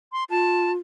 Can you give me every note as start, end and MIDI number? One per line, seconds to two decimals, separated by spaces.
0.12 0.24 84
0.30 0.76 65
0.30 0.72 81